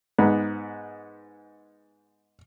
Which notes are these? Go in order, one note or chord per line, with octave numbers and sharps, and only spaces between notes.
G#2 B3